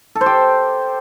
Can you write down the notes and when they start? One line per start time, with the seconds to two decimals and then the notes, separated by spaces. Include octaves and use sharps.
0.15 A4
0.21 C5
0.26 G4